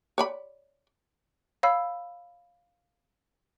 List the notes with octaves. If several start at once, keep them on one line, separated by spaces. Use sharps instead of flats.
C#5 D5 B5
C#5 F5 B5 E6